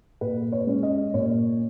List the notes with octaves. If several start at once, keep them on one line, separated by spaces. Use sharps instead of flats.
A#2 B4
C#5
G#3 C#4
D#5
A#2 C#5